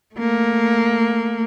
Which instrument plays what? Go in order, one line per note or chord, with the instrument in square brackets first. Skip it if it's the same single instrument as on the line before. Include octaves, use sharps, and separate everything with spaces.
[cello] A3 A#3